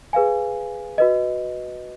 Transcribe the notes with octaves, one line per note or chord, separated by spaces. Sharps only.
G#4 B4 F5 G#5
F#4 B4 D#5